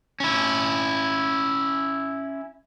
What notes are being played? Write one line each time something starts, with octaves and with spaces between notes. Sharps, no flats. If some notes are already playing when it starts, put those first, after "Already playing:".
C#4 E4